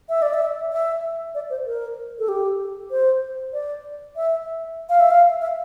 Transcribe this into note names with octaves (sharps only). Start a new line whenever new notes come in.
E5
D5
E5
E5
D5
C5
A#4
A4
G4
C5
D5
E5
F5
E5
F5
E5